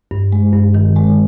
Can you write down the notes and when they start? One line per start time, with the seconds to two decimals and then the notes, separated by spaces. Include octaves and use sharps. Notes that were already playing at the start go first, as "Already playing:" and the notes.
0.11 G2
0.32 G#3
0.53 G2
0.75 D#3
0.96 G#3